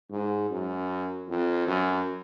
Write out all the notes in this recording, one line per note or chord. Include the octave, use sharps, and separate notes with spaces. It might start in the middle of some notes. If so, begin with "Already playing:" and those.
G#2
F#2
F2
F#2